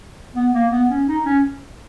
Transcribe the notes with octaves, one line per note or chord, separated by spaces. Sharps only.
B3
A#3
B3
C#4
D#4
C#4